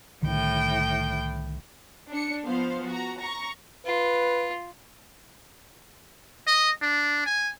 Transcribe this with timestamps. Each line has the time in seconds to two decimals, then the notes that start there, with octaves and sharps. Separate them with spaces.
0.23 C2 A2 D3 D#3 G5
2.11 D4 C#7
2.47 F3 B3 C5 F5
2.88 F#4 A#5
3.20 A#5 C#6
3.86 F4 B4
6.47 D#5
6.82 D4
7.26 G#5